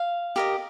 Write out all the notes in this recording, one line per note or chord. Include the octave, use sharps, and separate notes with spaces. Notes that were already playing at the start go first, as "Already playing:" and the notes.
Already playing: F5
G4 A#4 D#5